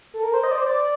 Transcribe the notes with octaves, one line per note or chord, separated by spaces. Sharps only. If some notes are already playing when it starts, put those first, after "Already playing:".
A4
A#4
C5
D#5
D5
C5
D5